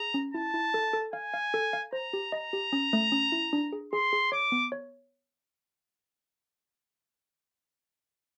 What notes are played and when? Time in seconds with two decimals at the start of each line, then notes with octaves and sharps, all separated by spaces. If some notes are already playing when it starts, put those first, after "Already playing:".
Already playing: G#4 A#5
0.14 C#4
0.33 E4 A5
0.54 E4
0.74 A4
0.93 A4
1.13 F5 G#5
1.34 F5
1.54 A4
1.73 F5
1.93 C5 A#5
2.13 G4
2.32 D#5 A#5
2.53 G4
2.73 C#4
2.93 A3
3.12 C#4
3.32 E4
3.53 D4
3.73 G#4
3.93 G#4 C6
4.13 G#4
4.32 C#5 D6
4.52 B3
4.72 C#5